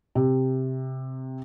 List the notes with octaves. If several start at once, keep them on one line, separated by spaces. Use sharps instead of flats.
C3